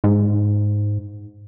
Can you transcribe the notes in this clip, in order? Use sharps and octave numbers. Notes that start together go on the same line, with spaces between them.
G#2